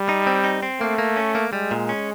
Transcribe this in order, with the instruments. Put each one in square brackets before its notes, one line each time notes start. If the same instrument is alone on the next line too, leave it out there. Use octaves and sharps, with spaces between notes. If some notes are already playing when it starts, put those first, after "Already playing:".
Already playing: [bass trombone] G3
[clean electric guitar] D#4
C4
D#4
C4
[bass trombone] A3 [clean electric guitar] A#3
[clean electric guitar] A#3
C#4
A#3
[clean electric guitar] G3 [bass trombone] G#3
[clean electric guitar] A#2
C#4